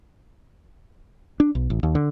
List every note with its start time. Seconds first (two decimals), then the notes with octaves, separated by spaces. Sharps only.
1.40 D4
1.55 B1
1.70 A1
1.83 D#2
1.95 D3